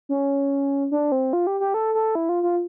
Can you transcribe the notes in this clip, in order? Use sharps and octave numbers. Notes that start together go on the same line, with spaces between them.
C#4
D4
C4
F4
G4
G4
A4
A4
E4
F4
F4